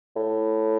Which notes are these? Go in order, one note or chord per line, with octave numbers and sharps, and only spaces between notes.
A2